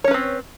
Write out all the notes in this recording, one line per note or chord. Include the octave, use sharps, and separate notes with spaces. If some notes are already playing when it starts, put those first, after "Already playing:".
C4 C#4 B4 C#5